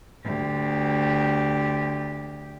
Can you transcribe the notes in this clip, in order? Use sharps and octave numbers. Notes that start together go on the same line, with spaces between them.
D2 G4